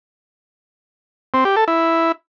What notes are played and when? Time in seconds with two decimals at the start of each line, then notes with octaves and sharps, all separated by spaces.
1.34 C4
1.45 G4
1.56 A4
1.68 E4